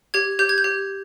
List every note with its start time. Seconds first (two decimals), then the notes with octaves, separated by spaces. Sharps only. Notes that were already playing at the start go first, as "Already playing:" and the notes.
0.14 G4 G#6
0.39 G4 G6
0.49 G#6
0.58 G6
0.64 G4